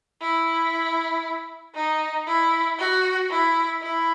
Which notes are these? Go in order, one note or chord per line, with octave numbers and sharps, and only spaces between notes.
E4
D#4
E4
F#4
E4
E4